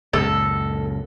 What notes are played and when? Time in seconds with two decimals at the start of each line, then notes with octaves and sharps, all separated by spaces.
0.13 C#2 F#2 A#2 A4